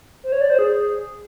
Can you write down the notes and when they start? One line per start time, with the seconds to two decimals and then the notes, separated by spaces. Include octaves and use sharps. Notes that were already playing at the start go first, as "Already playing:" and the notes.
0.23 C5
0.32 C#5
0.41 D5
0.50 C5
0.59 G#4